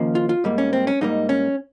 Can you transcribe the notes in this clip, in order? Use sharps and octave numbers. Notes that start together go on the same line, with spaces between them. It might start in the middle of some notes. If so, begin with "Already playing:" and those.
Already playing: D#2 C#3 F3 A#3
F4
F4
G#2 G3 A#3
C#4
C4
C#4
G#2 G3 A#3 D#4
C#4